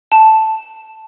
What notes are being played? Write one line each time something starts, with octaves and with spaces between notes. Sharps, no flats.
A5